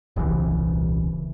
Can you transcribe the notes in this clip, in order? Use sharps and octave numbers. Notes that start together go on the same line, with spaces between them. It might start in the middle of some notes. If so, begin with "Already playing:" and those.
D#1 C2 C#3 E3